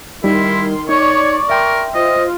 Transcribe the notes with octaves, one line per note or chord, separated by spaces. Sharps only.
D#3 G3 D#4 E4 C6
D#4 C#5 D5 C#6
A#4 E5 G5 C6
F4 C5 D#5